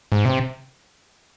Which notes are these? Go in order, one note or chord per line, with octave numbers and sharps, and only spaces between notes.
G#2
C3